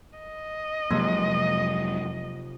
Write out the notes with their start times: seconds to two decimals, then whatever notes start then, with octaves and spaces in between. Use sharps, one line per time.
0.19 D#5
0.91 F1 F2 F#3 G#3 A#3